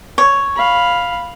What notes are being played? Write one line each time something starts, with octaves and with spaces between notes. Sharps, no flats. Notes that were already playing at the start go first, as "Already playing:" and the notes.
C#5
F5 B5